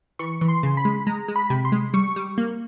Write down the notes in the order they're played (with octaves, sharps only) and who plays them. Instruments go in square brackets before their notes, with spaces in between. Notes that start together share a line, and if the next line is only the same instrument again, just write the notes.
[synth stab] E3 C#6
E3
C6
C#3
B5
G#3
G#3 A#5
G#3
B5
C3
C6
G#3
G3 C#6
G3
A#3